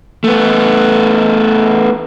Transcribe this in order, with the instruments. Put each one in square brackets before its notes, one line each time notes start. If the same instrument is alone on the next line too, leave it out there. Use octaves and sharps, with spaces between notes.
[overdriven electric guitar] A3 B3